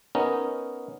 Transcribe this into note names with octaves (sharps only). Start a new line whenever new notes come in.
B3 C#4 D#4 A#4